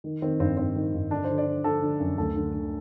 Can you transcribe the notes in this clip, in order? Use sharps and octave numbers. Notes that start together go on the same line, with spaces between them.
D#3
D#3 C4
G2 C4
G2 C4
D#3
G2
D3 D4
C5
D3
D5
D3
D3 A4
D3
F#2
D2 A4
D3
D3